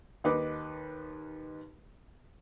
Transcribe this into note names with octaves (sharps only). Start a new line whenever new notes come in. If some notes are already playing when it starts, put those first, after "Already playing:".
D#2 D#4 B4 D6